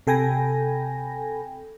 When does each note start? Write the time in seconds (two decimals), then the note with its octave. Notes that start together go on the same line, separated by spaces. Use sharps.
0.07 C3 A4 G5 G#5 B5 A#6